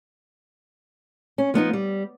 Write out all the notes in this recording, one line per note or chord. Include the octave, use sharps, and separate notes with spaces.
C#4
F3 B3 D4 D#4
G3